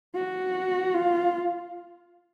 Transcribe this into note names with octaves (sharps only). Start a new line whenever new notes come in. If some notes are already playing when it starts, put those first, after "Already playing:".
F#4
F4